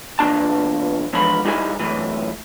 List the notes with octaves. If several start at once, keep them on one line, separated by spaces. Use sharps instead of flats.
E2 A#2 D4 A5
G#2 D3 E3 F3 B5
G3 D#4 E4 G#4 G#5
F#2 A2 E3